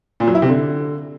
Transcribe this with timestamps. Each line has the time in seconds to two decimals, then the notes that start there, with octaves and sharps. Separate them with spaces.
0.20 A#2
0.27 F#3
0.35 E4
0.42 C3
0.50 D3